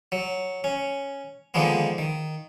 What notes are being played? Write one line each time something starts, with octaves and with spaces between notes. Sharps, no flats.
F#3
C#4
D3 D#3 F3 G#3 A#3 B3
D#3